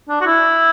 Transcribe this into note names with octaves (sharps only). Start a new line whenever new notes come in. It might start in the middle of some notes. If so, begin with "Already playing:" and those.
D4
F#4
E4